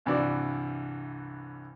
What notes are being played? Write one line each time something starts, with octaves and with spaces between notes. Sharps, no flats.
C2 G2 E3 F#4 D5